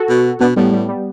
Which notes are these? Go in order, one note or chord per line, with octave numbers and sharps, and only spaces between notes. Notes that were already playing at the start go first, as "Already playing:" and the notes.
Already playing: F#4 A4
B2
B2 B3 D4
A2 G3 B3
G3
G3